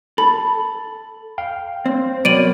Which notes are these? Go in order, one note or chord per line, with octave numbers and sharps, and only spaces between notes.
A4 B5
F5 G5
C4 C5
B2 F#3 A#4 C#5 D5 D7 D#7 F#7